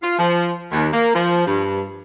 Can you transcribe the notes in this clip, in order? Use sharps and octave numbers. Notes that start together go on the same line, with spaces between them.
F4
F3
D#2
A#3
F3
G2